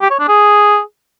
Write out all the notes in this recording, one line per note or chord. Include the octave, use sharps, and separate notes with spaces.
G4
C#5
D4
G#4